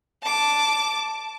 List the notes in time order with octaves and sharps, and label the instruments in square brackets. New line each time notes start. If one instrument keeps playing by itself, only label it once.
[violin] A5 D6